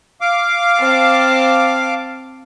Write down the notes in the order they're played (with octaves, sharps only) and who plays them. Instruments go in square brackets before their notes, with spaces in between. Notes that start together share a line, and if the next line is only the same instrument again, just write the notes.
[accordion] F5 D6
[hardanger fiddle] C4 A5